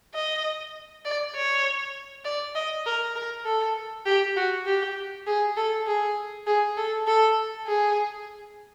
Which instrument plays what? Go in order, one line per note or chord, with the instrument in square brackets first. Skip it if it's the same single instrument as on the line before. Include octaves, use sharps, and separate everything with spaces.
[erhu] D#5
D5
C#5
D5
D#5
A#4
A#4
A4
G4
F#4
G4
G#4
A4
G#4
G#4
A4
A4
G#4